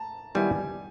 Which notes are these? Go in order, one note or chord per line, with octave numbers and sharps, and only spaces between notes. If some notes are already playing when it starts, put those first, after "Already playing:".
Already playing: A5 A#5
D#3 G3 B3 E4 G#5